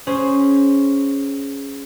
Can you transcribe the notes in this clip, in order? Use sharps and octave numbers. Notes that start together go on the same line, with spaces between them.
C#4 G#4 C5